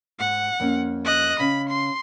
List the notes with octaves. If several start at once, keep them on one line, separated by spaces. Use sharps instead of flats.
G#2 F#5
F2 A#3 C#4
D#5 F#6
C#3 C#4 B5
C6